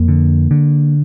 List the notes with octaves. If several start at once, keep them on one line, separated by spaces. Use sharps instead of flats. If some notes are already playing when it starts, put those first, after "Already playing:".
Already playing: F2 A#3
D3
D3